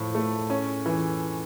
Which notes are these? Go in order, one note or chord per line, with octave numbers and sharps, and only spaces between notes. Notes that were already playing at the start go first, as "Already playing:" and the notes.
Already playing: A2 F3
A3
C#4
E3